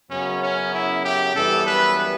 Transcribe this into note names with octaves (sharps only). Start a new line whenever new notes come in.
F#2 C#3 F#3 B3 C#4
C#4
E4
G4
F#2 E3 G3 B3 A4
B4